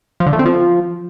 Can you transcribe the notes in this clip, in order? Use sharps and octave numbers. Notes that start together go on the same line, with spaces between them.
F3
D3
A3
C4
F3